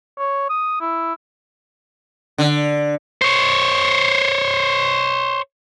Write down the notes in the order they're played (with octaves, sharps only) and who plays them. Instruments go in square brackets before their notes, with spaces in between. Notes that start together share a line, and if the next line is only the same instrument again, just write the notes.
[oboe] C#5
D#6
E4
[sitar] D3
[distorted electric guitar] C5 C#5